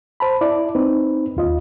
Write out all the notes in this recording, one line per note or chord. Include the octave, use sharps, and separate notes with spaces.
C5 A5 B5
E4 D5
C4 D#4 B4
D#2 F4 D#5